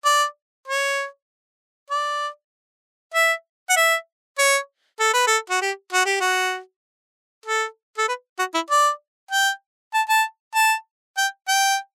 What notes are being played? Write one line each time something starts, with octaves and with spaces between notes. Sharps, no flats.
D5
C#5
D5
E5
F#5
E5
C#5
A4
B4
A4
F#4
G4
F#4
G4
F#4
A4
A4
B4
F#4
E4
D5
G5
A5
A5
A5
G5
G5